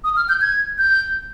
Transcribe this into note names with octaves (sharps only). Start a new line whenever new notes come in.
D#6
F6
G6
G#6
G6